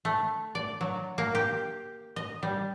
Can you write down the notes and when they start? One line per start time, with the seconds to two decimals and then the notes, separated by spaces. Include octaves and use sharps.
0.05 A3
0.55 D5
0.81 F#3
1.18 A#3
1.35 G4
2.16 D#5
2.43 G3